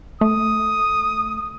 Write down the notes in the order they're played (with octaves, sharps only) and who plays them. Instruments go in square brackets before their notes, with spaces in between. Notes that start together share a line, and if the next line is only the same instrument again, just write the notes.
[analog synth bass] A3 [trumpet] D#6